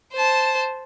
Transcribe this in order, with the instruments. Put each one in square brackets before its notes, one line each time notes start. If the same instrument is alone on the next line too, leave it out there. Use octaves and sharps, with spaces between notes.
[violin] C5 A5